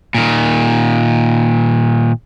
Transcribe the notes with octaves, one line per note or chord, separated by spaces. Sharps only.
A#2 D#3